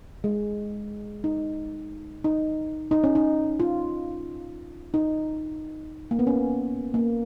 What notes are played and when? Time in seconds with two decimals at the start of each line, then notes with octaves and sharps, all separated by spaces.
0.24 G#3
1.24 D#4
2.24 D#4
2.91 D#4
3.04 C#4
3.15 D#4
3.60 F4
4.94 D#4
6.11 A#3
6.19 B3
6.27 C#4
6.94 A#3